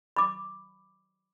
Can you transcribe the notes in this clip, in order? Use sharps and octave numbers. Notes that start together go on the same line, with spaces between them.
B5 D6